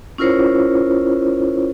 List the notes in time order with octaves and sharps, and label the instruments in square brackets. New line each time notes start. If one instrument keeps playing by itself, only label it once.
[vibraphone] C#4 E4 F4 A#4 C5 C#5